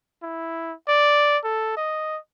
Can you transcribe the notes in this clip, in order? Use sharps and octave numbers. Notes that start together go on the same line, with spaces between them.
E4
D5
A4
D#5